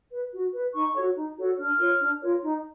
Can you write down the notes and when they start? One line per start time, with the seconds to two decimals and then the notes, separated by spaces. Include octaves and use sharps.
0.11 B4
0.32 F#4
0.53 B4
0.74 D#4 C#6
0.96 F#4 A4 C#5
1.16 D#4
1.37 F#4 A4 C#5
1.58 D4 F6
1.79 F4 A#4 C#5
2.00 D4
2.21 F4 A#4 C#5
2.42 D#4